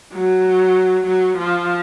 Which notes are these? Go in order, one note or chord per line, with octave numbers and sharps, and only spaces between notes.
F#3
F#3
F3